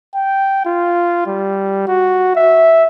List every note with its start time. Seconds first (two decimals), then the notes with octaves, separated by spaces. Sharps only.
0.15 G5
0.66 F4
1.27 G3
1.88 F#4
2.36 E5